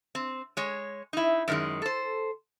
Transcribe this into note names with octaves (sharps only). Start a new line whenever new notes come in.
C4
G#3 C#5
D#4 E4
F#2 D#3 G#3
A4 C5